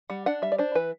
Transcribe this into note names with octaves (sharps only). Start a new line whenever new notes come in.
G3 F#5
D4 F#5
G3 E5
D5
D4 C5
E3 B4